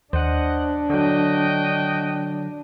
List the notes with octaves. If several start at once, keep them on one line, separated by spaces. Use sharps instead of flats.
D#2 D4 C5 D#5 F#5
D3 F#3 F#4 D#5 G5